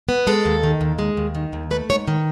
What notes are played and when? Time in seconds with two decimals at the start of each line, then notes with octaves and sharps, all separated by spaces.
0.09 B3
0.27 G#3 A4
0.45 D#2
0.63 D#3
0.81 D#2
0.99 G#3
1.17 D#2
1.35 D#3
1.53 D#2
1.71 A3 B4
1.89 G#2 C#5
2.08 D#3